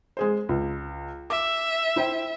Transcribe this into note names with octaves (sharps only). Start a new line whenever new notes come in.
G#3 G#4 C5
C#2
E5 D6
E4 C5 G5